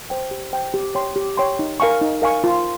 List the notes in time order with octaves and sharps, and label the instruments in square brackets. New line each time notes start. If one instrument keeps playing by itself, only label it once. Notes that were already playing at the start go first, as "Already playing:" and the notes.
[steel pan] C5 G5
G4
C5 G5
G4
C#5 G5 C6
G4
C#5 G5 C6
D#4
A#4 F5 G#5 C#6
D#4
A#4 F5 G#5 C#6
F4